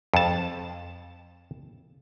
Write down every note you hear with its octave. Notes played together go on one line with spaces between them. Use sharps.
F2 A5